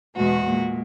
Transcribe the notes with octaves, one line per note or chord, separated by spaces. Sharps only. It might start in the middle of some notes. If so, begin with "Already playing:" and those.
E2 B2 G#3 F#4
A#2 G#3